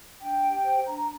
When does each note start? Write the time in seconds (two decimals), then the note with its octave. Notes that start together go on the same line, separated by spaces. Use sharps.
0.21 D4 G5
0.43 G4
0.64 C5
0.87 D4 A#5